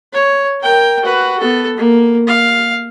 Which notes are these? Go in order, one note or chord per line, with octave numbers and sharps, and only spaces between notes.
C#5
A#4 G5
F#4 B4
B3 A4
A#3
F5